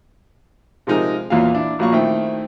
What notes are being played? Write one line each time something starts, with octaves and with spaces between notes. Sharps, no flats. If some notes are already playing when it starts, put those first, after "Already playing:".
C3 F3 G#3 D#4 G#4 A#4
E2 A#2 E3 F#3 A#3 F5
D4 E4
A#1 F#3 A#3 C#6
D#3 A3 C4 E4 G5